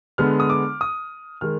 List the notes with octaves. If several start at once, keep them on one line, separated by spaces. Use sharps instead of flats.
D3 G#3 B3 F6
D#6
D6
D#6
D#3 G#3 F6